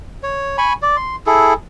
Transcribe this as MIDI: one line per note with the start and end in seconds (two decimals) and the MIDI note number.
0.23 0.57 73
0.58 0.73 80
0.58 0.73 83
0.58 0.73 85
0.82 0.97 74
0.97 1.16 84
1.26 1.53 64
1.26 1.53 68
1.26 1.53 69